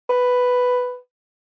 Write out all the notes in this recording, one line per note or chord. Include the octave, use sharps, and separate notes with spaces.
B4